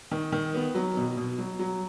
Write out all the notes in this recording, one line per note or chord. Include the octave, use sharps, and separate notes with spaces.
D#3
D#3
B3
F#3
B2
B2
F#3
F#3